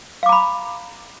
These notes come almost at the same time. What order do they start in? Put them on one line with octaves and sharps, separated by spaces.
F5 D6 A#5 B5